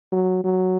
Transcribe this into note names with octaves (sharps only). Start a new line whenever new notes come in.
F#3
F#3